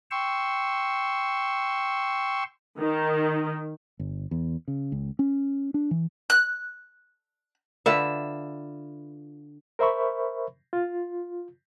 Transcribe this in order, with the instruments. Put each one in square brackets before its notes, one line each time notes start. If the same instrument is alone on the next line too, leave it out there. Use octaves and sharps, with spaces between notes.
[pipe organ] G5 C6 C#6 E6
[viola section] D#3
[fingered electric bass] G1
E2
C#3
C#2
C#4
D4
E3
[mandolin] F#6
[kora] D3 F4 B4 E5
[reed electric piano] A#4 C5 E5 B5 C#6
F4